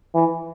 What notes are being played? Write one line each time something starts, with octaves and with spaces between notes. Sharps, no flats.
E3